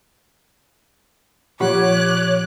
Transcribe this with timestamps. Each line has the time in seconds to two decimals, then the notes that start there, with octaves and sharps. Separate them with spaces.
1.60 A#2 F3 F4 G4 C#5 F#5 D6 F#6